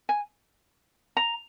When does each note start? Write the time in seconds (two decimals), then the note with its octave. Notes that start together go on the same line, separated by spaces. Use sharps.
0.09 G#5
1.17 A#5